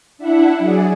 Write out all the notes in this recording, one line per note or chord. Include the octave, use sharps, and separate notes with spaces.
D4 E4 E5 F#5
F#3 G#4 D5